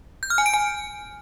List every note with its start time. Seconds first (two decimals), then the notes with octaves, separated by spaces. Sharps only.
0.23 G6
0.30 F6
0.38 G#5
0.46 D7
0.54 G#5